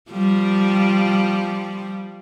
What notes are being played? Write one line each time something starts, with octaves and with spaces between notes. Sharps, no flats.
F3 G3